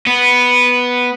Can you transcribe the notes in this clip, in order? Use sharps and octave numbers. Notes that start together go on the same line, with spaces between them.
B3